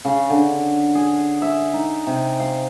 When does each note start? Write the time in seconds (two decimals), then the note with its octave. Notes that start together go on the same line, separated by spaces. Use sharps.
0.05 C#3
0.30 D3
0.95 G#4
1.42 E5
1.73 D#4
2.07 C3
2.40 F5